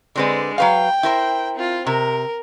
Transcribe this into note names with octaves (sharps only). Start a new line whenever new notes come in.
D3 G#3 C4 B4 D5
F#3 B4 F5 G5
E4 A#4 C5
C4 F4
C3 A#4